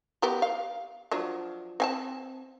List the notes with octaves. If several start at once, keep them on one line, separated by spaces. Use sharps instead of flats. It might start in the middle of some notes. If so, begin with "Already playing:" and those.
B3 G4 A#4
F5
F3 F#3 D4
C4 G#5 A5